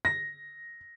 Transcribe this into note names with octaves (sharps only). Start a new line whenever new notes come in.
A#6